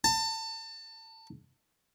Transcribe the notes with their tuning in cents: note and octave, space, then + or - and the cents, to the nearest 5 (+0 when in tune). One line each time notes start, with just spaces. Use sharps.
A5 +30